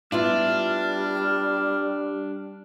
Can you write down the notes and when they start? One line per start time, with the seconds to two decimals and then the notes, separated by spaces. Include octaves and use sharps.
0.12 G3 B3 D4 E4 F4 F6